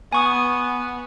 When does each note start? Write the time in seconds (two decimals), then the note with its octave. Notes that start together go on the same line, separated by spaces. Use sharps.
0.13 B3 G#5 C#6 D#6